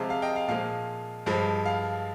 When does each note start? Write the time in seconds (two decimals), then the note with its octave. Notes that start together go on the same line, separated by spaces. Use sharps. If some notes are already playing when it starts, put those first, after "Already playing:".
Already playing: C3 F3 G#3 F5
0.10 F5
0.22 D#5 G5
0.36 F5
0.48 A#2 F3 G#3 F5
1.26 G2 F3 G#3
1.66 F5